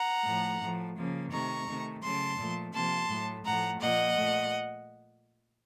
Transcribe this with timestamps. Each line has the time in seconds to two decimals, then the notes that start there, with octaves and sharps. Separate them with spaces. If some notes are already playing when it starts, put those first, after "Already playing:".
Already playing: F#5 A#5
0.24 A2 F3 A3
0.61 A2 F3 A3
0.96 C#3 F3 A#3
1.31 C3 D#3 A3 A#5 C#6
1.67 C3 D#3 A3
2.02 C#3 F#3 A3 A5 C6
2.38 A#2 F3 A3
2.73 C3 F3 A#3 A5 C6
3.08 A2 F#3 A3
3.44 A2 F3 A3 F#5 A#5
3.80 A#2 F3 A#3 D#5 F#5
4.15 A#2 A3